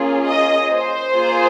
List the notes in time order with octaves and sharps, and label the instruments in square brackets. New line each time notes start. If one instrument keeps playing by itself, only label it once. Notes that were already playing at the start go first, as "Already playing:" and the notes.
Already playing: [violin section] A#3 C#4 F4 G#4
D#5
C5
A#3 F4 G#4